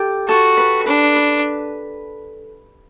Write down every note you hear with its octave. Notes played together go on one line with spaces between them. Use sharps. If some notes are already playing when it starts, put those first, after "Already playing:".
Already playing: G4 A4
F#4 A4
B4
D4 B4
B4